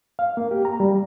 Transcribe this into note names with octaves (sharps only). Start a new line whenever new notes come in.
F5
A#3
G4
A#5
G3